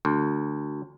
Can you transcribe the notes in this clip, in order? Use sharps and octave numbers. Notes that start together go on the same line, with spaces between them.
D2